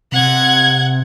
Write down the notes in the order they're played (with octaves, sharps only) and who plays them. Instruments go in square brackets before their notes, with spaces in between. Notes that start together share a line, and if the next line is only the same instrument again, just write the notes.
[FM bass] C3 [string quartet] F#5 G#6